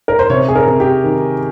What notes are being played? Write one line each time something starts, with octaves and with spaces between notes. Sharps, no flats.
A#4
C5
C3 C#5
G#4
A#4
C3
G4
D#3